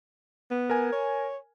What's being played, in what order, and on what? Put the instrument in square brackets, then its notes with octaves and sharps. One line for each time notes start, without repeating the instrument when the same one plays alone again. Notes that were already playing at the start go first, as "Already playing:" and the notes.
[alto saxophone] B3
[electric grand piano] A#4 G#5
[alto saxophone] C#5